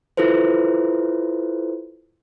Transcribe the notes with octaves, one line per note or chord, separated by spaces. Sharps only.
E4 F4 A4 B4 C5